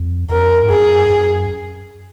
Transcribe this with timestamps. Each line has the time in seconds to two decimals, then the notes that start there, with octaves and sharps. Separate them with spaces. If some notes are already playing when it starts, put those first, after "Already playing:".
Already playing: F2
0.29 F2 A#4
0.63 G#2
0.69 F#2 G#4
1.10 F#2